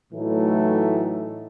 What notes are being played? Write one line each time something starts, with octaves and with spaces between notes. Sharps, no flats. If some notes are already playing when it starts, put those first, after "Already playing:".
A2 E3 F#3 A3 D#4